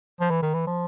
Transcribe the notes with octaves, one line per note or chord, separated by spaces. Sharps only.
F3
E3
D#3
E3
F3